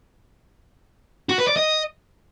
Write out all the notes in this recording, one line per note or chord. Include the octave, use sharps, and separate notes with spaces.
F#4
B4
D5
D#5